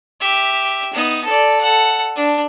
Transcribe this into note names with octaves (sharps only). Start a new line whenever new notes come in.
G4 E5
B3 D#4
A4 D5
A4 F#5
D4